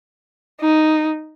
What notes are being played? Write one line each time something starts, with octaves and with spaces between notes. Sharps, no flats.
D#4